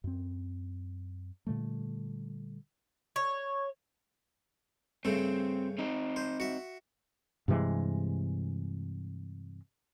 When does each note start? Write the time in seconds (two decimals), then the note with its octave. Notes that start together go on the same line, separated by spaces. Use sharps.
0.04 F#2 C4
1.47 A#2 D3 G3 A3
3.16 C#5
5.05 G2 C#3 A3 C4
5.78 C4 D#4
6.16 C5
6.40 F#4 E5
7.48 G2 C3 E3 G#3